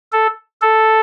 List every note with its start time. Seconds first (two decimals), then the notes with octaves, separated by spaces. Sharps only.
0.12 A4
0.62 A4